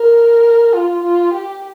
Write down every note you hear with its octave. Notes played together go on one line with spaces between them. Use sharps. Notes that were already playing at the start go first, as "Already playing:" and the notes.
Already playing: A#4
F4
F4
G4